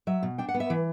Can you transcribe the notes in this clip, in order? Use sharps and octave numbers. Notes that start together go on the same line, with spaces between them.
F#3 E5
B2
D4 G5
F#5
B3
E5
E3